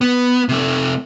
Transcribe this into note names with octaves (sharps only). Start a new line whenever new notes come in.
B3
C3 A3